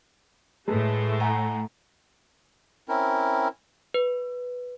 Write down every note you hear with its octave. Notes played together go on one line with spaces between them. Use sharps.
A2 G#3 A3 A4 B4
F#5 G#5 A#5
C4 C#4 E4 A#4
B4